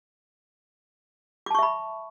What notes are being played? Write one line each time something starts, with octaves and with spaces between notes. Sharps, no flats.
E5 A5 B5 C#6 D6